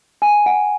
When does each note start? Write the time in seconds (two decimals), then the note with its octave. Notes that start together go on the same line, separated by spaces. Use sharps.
0.22 G#5
0.46 F#5